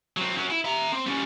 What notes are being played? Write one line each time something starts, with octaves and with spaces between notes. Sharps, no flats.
F#3 C4
F#3 C#4
E4
E5 A#5
C4
G3 C#4